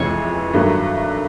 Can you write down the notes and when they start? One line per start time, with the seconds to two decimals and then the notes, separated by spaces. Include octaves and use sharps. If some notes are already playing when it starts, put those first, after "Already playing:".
Already playing: F2 C3 E3 G#3 C#5
0.53 G2 D#3 F#3 A3